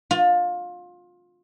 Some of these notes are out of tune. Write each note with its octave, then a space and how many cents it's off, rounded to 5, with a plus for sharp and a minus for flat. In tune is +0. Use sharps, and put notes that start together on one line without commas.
F4 +25